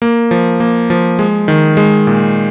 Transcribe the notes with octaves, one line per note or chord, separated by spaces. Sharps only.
A#3
F3
A#3
F3
G#3
D#3
G#3
A#2